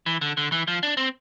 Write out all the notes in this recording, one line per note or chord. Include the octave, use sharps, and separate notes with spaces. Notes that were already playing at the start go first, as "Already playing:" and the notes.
E3
D3
D3
E3
F3
D4
C4